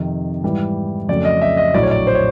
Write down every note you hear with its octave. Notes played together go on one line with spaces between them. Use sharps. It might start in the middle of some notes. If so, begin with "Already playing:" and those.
Already playing: F2 C3 D#3
G#2 E3 G3
F2 C#3 F#3 A3 D5
D#5
E5
D#5
A#1 A2 F#3 D5
C#5
D5
C5
C#5